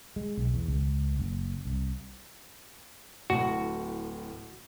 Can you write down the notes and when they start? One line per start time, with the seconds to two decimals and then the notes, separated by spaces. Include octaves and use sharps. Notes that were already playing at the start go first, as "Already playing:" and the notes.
0.16 G#3
0.38 B1
0.54 E2
0.68 C#2
1.20 F#1
1.65 C2
3.30 D1 A2 F#4